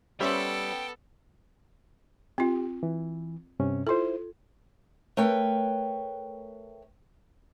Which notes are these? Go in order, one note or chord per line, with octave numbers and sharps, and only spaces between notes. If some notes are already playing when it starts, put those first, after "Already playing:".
G3 B3 C#4 A4 C5 E5 G5
C4 F4 G4
E3
G2 C3 C#4
E4 F4 A4 C5
A3 A#4 B4 C#5 G5